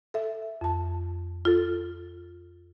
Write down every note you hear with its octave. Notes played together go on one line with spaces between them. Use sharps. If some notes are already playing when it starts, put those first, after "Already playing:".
A4 E5
F2 A5
F4 A4